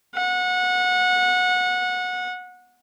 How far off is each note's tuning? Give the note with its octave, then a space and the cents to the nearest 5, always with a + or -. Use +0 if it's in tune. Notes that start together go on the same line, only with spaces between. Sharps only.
F#5 -25